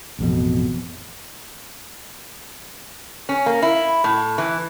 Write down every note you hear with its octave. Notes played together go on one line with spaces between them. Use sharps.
A1 F2 B2
C#4
A#3
E4
A2
E3